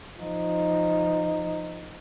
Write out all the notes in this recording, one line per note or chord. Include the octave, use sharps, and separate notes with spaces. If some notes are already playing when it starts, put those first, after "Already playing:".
F3 D#4